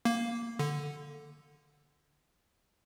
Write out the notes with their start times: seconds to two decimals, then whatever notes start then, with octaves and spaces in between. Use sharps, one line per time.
0.05 A#3
0.59 D3